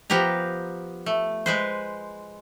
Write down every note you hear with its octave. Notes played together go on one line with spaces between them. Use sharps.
F3 B3 G4 G5 A#5
A3
G#3 B4 C5